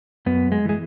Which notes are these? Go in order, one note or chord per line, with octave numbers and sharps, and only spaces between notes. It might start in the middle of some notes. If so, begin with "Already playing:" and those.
F#2 B3
G#3
E3 G#3